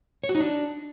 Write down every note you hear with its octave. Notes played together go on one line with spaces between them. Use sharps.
C#5
F#4
D#4
D4